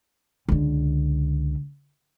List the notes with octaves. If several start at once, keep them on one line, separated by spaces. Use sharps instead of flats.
C#2 D3